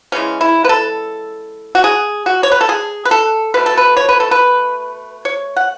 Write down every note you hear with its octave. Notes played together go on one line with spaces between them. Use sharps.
C#3 E3 G#3 C#4
E4
B4
A4
F#4
G#4
F#4
C#5
B4
A4
G#4
B4
A4
B2 A3 B4
A4
B4
C#5
B4
A4
B4
C#5
F#5